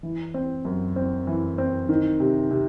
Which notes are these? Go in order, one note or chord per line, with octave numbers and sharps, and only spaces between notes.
E3
C4
F#2
C4
E3
C4
D#3
C3
C3